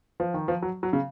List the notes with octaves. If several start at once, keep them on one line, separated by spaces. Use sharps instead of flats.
F3
D#3
F3
F#3
F#3
C#3